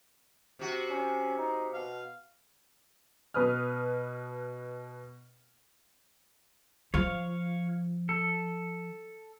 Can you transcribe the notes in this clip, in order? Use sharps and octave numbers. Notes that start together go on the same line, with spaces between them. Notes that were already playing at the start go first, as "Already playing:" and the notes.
C3 F#4
C#4
D#4
B2 F5
B2 B4 D#6 F6
F3 C#5 F5
A4